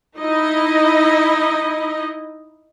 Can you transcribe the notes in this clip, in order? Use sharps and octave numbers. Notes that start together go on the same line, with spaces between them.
D#4 E4 D#5